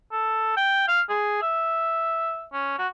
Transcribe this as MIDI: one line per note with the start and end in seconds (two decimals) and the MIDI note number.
0.12 0.55 69
0.57 0.84 79
0.88 1.01 77
1.09 1.37 68
1.42 2.45 76
2.53 2.75 61
2.79 2.87 66